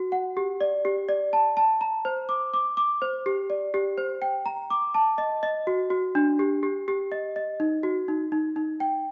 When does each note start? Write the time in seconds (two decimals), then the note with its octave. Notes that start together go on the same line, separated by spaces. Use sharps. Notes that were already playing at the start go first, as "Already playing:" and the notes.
Already playing: F#4
0.12 F#5
0.37 G4
0.61 D5
0.85 G4
1.09 D5
1.33 A5
1.57 A5
1.81 A#5
2.05 C5
2.29 D6
2.54 D6
2.77 D6
3.02 C5
3.26 G4
3.50 D5
3.74 G4
3.98 C5
4.22 G5
4.46 A#5
4.70 D6
4.94 A5
5.18 D#5
5.43 D#5
5.67 F#4
5.90 F#4
6.15 D4
6.39 G4
6.63 G4
6.88 G4
7.12 D#5
7.36 D#5
7.60 D#4
7.83 F#4
8.08 D#4
8.32 D#4
8.56 D#4
8.80 G5